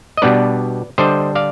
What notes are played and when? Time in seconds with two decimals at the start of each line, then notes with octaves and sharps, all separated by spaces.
0.17 D#5
0.22 B2 G3 B3 D4 B4 D5
0.98 D3 G3 D4 C5 D#5
1.35 D5 F5